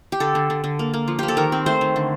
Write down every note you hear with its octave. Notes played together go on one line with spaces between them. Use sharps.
G4
D3 A4
D3
D3
D3
A#3
A#3
F3
A#3 G4
A4
D#3 A#4
C4
A3 C5
D#3
D3